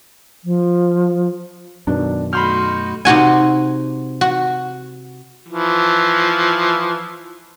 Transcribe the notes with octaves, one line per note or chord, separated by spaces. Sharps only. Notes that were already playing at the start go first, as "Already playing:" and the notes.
F3
F#2 B2 D#3 D4
A3 D#4 F#4 B5 C6 F6 G6
C3 D#4 F#4 G#5
F#4
E3 F3